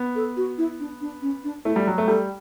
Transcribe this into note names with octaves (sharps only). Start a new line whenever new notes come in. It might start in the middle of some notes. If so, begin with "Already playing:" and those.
Already playing: B3
A4
F#4
E4
D4
D4
C#4
D4
A3 E4
G3
F#3
A3
G3 A4